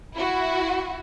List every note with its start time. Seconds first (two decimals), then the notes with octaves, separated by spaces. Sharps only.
0.15 E4 F#4